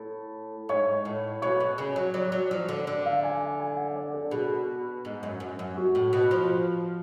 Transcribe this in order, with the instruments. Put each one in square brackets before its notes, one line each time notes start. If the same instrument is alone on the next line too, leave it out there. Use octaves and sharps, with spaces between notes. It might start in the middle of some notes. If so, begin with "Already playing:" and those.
Already playing: [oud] A2
[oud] G#2 [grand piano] C#5
[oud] A2
[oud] B2 [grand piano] C#5
[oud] B2
C#3
F#3
[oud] F#3 [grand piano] D5
[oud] F#3
F3
D3
[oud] D3 [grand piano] D5
[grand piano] F5
G#5
G#5
G#5
F#5
D5
A4
[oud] B2 [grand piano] G#4
[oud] G#2
F#2
F#2
F#2
[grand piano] F#4
[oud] A2
B2
F3